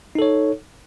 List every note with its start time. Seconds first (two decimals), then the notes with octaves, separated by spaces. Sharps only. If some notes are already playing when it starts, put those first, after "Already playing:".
0.15 D#4
0.19 A4
0.22 C#5